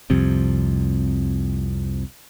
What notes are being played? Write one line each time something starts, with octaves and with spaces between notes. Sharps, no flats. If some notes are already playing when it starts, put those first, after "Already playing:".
C2 F2 C3